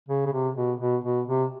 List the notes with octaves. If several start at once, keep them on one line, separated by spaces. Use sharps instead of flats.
C#3
C#3
C3
B2
B2
B2
C3